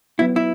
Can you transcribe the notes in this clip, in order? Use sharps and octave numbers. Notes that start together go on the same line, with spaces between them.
F#3 B3 E4 F#4
E4